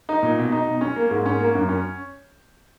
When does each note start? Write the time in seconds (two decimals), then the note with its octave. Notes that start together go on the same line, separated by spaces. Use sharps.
0.09 D#4
0.23 A#2
0.38 B2
0.52 D#4
0.68 B2
0.81 C#4
0.96 A#3
1.11 G#2
1.25 C#4
1.40 A#3
1.55 F#2
1.69 C#4